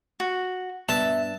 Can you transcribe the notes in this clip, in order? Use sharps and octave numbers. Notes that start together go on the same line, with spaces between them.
F#4
G2 B3 E5 A5